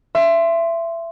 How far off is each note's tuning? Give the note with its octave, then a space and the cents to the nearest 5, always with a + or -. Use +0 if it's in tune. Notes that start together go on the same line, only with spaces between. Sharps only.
E5 +25 C6 +0